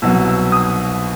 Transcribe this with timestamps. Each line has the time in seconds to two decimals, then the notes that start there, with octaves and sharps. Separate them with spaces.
0.02 C2 B2 F#3 E6
0.28 E6
0.52 D#6